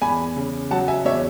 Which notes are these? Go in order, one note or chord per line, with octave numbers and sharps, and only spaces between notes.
E2 G#5 B5
C#3
F#3 F#5 A5
E5 G#5
E2 C#5 E5